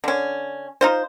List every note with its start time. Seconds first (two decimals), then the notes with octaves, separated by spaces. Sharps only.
0.04 D3 C#4
0.81 D#4 F4 C5